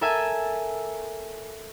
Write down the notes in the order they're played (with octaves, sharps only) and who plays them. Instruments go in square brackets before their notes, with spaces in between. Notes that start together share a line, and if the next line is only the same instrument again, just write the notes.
[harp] A4 A#4 E5 G#5